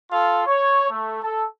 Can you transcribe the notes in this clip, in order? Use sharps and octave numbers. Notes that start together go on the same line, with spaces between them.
F4 A4 F5
C#5
A3
A4